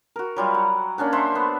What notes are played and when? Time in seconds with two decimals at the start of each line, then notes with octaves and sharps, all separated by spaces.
0.16 F#4 A#4
0.36 F#3 G3 F4
0.54 F#5
0.98 A#3 C#4 D4 F#5
1.12 C5 E5 F#5 C6
1.35 B3